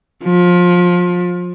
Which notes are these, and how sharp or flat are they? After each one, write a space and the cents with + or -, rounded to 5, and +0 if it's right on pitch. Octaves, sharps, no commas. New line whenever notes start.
F3 +25